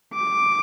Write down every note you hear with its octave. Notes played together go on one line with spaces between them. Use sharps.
D6